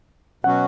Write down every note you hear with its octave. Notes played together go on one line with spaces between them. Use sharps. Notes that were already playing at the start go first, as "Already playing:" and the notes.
B2 F#3 C#4 F#4 F#5